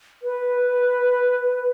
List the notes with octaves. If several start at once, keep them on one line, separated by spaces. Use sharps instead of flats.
B4